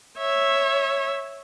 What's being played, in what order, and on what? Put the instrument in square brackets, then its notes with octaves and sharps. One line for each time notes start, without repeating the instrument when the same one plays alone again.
[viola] C#5 E5